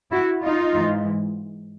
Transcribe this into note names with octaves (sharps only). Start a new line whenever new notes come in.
E4 F#4
D#4 F4
G#2 E3